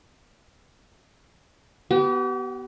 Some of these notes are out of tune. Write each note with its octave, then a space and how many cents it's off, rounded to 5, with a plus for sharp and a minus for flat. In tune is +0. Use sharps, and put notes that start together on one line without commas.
B3 +0 G4 -40